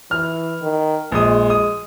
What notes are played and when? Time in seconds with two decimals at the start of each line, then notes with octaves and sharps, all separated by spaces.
0.11 E3 F6
0.62 D#3
1.12 A#1 G#3 D#6
1.50 D#6